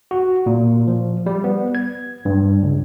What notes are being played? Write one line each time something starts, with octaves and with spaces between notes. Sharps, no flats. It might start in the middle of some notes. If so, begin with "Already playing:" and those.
F#4
A#2
F3
G3
B3
G#6
G2
C#2